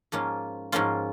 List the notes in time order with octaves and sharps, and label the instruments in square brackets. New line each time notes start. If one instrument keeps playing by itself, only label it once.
[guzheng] G#2 F3 A#3 C#4 F4
G#2 F3 A#3 C#4 F4